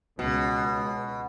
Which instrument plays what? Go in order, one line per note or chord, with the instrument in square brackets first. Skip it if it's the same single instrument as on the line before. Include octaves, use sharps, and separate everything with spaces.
[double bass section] C#2 [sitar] B2